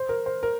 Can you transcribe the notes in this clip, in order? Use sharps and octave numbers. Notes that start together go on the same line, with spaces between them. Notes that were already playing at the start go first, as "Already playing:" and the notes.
Already playing: C5
A#4
C5
A#4